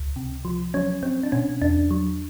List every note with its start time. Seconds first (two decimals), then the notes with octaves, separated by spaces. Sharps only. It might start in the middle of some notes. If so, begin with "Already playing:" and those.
Already playing: C#2
0.16 C3
0.45 F3
0.74 F#3 C#4
1.03 F#3 C4
1.23 D4
1.32 B2 C#4
1.62 E2 D4
1.91 F#3